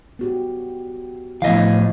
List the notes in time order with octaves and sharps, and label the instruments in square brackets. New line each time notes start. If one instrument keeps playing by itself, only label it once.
[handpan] B3 F#4 G4
[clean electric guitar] A2 D#5 F5 [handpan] E3 F3 B3